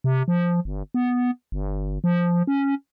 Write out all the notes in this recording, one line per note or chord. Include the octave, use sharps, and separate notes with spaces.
C3
F3
G1
B3
G1
F3
C#4